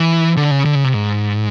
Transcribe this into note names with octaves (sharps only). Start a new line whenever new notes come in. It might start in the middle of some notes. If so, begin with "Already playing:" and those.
Already playing: E3
D3
C#3
D3
C#3
C3
G#2